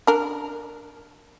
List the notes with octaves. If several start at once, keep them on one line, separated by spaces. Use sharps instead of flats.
D4 A#4